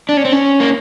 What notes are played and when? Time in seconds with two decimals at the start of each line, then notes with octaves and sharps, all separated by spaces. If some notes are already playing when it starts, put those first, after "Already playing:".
0.09 D4
0.17 C#4
0.25 C4
0.33 C#4
0.60 A#3